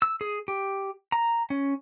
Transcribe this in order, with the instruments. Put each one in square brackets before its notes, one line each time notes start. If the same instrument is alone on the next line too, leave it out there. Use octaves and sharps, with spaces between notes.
[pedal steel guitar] E6
G#4
G4
A#5
C#4